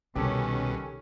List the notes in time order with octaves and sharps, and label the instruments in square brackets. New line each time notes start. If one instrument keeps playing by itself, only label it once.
[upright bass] C2 [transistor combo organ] B2 [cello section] D#3 C#4 [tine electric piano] G4 A4